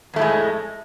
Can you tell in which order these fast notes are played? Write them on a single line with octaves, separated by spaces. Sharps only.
F2 A3 A2 G#3